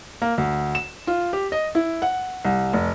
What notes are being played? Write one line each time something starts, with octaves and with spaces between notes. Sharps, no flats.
A#3
D2
E7
F4
G4
D#5
E4
F#5
C2
F1